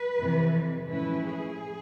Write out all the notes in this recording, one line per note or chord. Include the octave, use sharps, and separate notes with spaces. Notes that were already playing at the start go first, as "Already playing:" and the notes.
Already playing: B4
F2 C3 E3
A2 F3 G#3 C#4 E4 B4
G#4